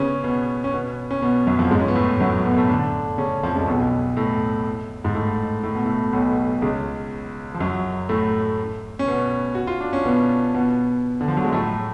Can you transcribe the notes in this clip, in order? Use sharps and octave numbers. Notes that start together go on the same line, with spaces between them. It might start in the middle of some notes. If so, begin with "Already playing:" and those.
Already playing: C#3 B3 C#4
B2 B3
C#4
B2 B3
C#4
B2 B3
F#2 F#3
F2 F3
G#2 G#3
C#4
B3
A2 A3
F#2 F#3
B2 B3
A2 A3
D3 D4
C#3 C#4
F2 F3
C#2 C#3
B1 B2
A2
G#2
A2
A2
B2
A2
B1 B2
C#2 C#3
F3
F#2 F#3
A2 A3
C#4
B2 B3
F#4
F4
D4
C#4
B2 B3
B2 B3
D3
F3
F#3
G#3
A2 A3